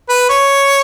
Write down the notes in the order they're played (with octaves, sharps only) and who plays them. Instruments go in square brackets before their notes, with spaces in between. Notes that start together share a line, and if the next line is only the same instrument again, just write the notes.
[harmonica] B4
C#5